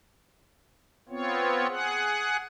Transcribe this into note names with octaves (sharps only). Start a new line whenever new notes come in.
B3 C4 F4 C#5
G#4 F#5